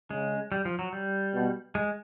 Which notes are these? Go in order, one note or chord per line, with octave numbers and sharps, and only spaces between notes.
C#3 G#3
G3
F3
F#3
G3
B2
G#3